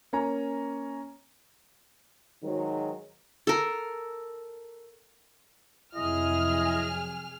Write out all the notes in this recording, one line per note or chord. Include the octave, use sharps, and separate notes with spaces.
A#3 C#4 C#5 G#5 A#5
G#2 D#3 F#3
A4 A#4
F2 C3 F#3 E4 G#4 D#5 F6